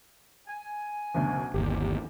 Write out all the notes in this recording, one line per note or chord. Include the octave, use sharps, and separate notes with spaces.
G#5
F#1 D2 B2
G1 D#2 G4